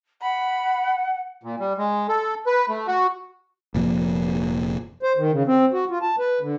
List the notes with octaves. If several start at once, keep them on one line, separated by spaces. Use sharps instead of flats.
F#5 B5
A#2
G3
G#3
A4
B4
A3
F#4
F1 A#2 F3
C5
D#3
C#3
C4
F#4
F4
A5
B4
D3